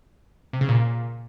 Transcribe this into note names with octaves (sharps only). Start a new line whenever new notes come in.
C3
C#3
A#2